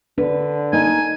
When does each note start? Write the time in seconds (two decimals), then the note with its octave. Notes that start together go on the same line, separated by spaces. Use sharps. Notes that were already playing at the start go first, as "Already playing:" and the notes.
0.18 D3 D4 B4
0.73 A#3 D#4 G#5